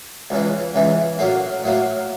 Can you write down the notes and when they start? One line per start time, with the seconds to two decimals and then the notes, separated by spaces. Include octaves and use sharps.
0.30 C#2 C#3 E3
0.75 C#2 C#3 E3
1.19 A2 F#3 A#3
1.64 A2 F#3 A#3